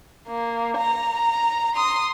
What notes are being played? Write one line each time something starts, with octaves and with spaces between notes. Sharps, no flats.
A#3
A#5
C6 D#6